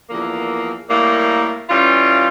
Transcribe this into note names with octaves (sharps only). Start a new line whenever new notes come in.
E2 D3 F3 A#3
A2 G3 A#3
E3 G3 C#4 F4